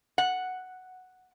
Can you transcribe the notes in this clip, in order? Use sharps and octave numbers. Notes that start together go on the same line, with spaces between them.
F#5